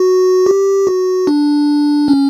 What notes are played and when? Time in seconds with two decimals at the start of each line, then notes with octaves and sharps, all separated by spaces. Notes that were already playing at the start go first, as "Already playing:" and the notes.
Already playing: F#4
0.46 G4
0.87 F#4
1.27 D4
2.08 C#4